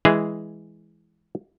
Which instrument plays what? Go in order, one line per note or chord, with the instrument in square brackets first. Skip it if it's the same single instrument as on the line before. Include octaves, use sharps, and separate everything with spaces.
[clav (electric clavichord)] E3 G#3 G#4